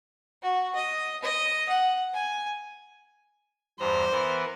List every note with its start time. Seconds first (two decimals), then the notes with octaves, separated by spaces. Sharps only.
0.42 F#4
0.75 D#5
1.22 D#5
1.69 F#5
2.14 G#5
3.79 E2 G2 C5 A#5
4.11 E3 B3 A#4